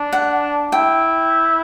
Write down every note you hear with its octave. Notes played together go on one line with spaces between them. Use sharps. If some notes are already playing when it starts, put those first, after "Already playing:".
Already playing: D4
F#5
E4 G5